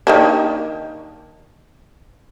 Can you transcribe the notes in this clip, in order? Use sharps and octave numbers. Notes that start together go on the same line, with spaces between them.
D#3 A#3 D4